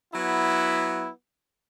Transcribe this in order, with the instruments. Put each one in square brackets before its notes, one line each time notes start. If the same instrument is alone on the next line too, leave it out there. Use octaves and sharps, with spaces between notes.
[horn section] F#3 B3 E4